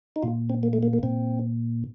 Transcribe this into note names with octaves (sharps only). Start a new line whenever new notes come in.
D#4
A#2 F4
C4
A#3
A3
A#3
A#3
A#2 C4